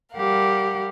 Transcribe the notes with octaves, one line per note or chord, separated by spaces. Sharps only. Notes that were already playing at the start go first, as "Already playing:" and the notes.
G3 G4 A#4 F5 F#5